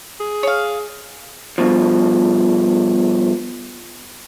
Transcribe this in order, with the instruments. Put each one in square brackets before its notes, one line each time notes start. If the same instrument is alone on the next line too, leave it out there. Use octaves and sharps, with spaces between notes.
[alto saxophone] G#4
[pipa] C#5 F5
[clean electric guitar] G2 B2 F3